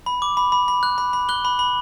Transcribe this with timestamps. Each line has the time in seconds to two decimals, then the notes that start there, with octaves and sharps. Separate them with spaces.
0.06 B5
0.22 D6
0.37 B5
0.52 B5
0.68 B5
0.83 F#6
0.98 B5
1.13 B5
1.29 F#6 G7
1.45 B5
1.59 B5